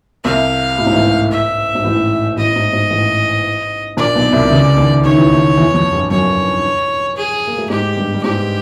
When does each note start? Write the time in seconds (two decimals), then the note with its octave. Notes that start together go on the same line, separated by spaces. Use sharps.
0.24 C2 C3 F5
0.78 A2
0.87 G#2
0.95 A1 A2
1.31 E5
1.75 G#2
1.84 A1 A2
2.37 A1 A2 D#5
2.56 G#2
2.73 G#2
2.91 A1 A2
3.97 A#1 A#2 D5
4.15 B1 B2
4.32 C2 C3
4.51 C#2 C#3
4.77 D#2 D#3
5.03 D#3 C#5
5.17 E3
5.30 D#2 D#3
5.57 E2 E3
5.74 F2 F3
5.93 G2 G3
6.10 F#2 F#3 C#5
7.17 G#4
7.47 A#3
7.58 A3
7.70 G#2 G#3 G4
7.97 G2 G3
8.14 G3
8.23 G#2 G#3 G4